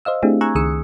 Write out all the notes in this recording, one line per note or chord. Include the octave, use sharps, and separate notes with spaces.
C5 D#5 F5 E6
A3 C4 D4 E4 G4 G#4
G#5 A#5 C#6 E6 F#6 G#6
C#2 D#3 G#4 D#6 E6 C#7